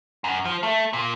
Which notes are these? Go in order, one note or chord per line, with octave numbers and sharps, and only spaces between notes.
F#2
F3
A3
A#2